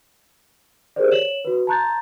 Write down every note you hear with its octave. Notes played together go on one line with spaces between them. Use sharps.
G4 G#4 A#4 C5 D5
C#5 E7 F#7
F#4 B4
A5 A#5 C6 F#6 G6 A6